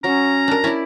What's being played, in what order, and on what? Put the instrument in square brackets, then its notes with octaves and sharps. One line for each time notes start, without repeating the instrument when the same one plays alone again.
[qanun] F#3 [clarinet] C#4 [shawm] A#5
[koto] D4 A#4
[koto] C#4 [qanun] E4 D5